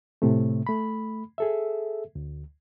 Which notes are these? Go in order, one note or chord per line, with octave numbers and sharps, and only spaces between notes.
A2 C3 A3
A3 B5
G#4 A4 E5
D2